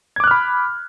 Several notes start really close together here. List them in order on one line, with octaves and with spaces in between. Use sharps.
G#6 D6 F#6 F6 B5